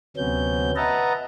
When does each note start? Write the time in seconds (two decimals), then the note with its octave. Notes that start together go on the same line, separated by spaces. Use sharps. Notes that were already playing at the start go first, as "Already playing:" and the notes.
0.17 D2 C3 F#3 B3 C#4 G6
0.76 B4 D#5 E5 F#5 A5 A#5